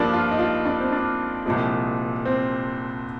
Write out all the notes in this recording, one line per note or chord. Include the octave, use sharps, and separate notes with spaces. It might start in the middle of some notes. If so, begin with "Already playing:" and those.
Already playing: G2 F3 A#3 D4
F4
D#4
F4
D4
C4
D4
C2 A#2 F3 G#3
C4